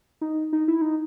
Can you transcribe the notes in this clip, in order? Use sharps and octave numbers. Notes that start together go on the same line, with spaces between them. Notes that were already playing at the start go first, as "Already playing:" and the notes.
D#4
D#4
E4
D#4